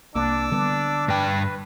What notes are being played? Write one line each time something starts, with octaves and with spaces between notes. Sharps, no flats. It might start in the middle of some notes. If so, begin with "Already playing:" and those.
C2 A#3 D4 D6 E6
D3 G3 B3 D4
G2 B4 G5